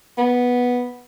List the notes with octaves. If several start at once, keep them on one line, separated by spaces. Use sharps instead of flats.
B3